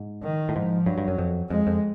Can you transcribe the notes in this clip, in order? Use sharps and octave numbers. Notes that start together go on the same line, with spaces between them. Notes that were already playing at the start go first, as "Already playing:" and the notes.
Already playing: G#2
D#3
A2
G#2 F3
G2 F#3
G2
F#2
F2
F2 G#3
F2